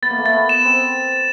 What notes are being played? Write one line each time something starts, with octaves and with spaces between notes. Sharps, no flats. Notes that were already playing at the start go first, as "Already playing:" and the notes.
B3 A6
A#3
A3
A#3 A6
B3
E7
C4